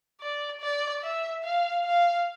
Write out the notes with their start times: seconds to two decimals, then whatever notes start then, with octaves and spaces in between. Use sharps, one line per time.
0.21 D5
0.61 D5
1.03 E5
1.44 F5
1.85 F5